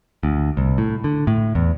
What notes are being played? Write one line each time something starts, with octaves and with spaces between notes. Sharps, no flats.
D2
C2
A2
D3
A2
E2